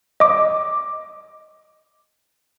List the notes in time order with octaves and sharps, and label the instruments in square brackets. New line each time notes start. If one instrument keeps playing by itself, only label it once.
[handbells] D#5 D6